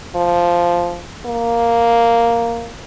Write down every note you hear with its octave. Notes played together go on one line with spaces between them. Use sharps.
F3
A#3